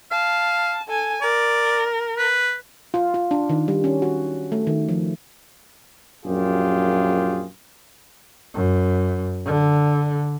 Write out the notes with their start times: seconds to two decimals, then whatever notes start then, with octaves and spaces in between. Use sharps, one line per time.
0.11 F5 A5
0.88 A4 G#5
1.22 A#4 D5
2.18 B4
2.94 F4
3.14 F4
3.31 D4
3.49 D#3
3.68 G3
3.84 C#4
4.02 F#4
4.52 A3
4.67 D#3
4.89 F3
6.24 A#1 F#2 F4 G4 G#4
8.54 F#2
9.45 D3